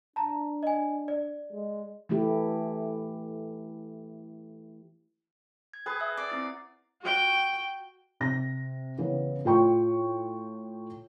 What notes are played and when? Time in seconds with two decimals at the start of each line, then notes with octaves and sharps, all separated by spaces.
0.16 D4 A5 A#5
0.63 D#5 G#5
1.08 D5
1.53 G#3
2.09 E3 A3 E4 G4
5.74 G#6
5.86 G#4 B4 G5 D#6 G#6
6.00 E5 E6
6.17 D5
6.30 C4 E4 A6
7.02 F#4 G5
8.20 C3 A#6
8.98 C#3 E3 B3
9.45 A2 F4 G5 C#6